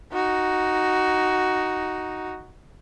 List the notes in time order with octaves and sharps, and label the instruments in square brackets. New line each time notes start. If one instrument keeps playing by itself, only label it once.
[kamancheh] D#4 F#4